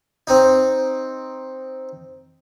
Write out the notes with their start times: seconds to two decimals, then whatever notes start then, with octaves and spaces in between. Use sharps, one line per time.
0.27 C4 D#4